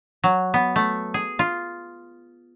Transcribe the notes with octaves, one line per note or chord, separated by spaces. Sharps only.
F#3
B3
A3
G#4
F4